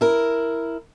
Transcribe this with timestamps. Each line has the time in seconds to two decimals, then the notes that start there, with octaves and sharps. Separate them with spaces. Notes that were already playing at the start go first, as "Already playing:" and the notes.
0.01 E4 A#4